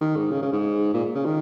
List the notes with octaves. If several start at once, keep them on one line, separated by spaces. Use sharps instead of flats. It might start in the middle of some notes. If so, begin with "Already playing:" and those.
D#3
G#2
C#3
C#3
G#2
A#2
C#3
D#3